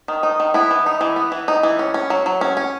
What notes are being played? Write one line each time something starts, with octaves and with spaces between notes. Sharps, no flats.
D#3
D#4
D#3
B3 E4
E3
D#4
E3
B3
E3
D#4
E3
C#4
C#4
F#3
F#3
C#4
C#4